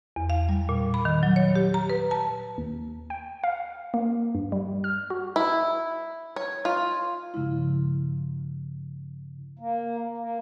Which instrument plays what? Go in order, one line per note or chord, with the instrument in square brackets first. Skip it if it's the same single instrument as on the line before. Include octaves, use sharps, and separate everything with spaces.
[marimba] E2
F5
G3
A#2
B5
D#3
F#3
C#5
G4
A#5
B4
A5
[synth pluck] D#2
G5
F5
A#3
G2
G3
F6
F#4
[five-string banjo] E4
C#5
F4
[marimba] G2 C#3 F3 G#3 E4
[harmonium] A#3
A#3